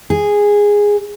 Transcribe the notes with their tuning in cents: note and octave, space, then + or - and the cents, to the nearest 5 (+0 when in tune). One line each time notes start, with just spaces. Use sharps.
G#4 -10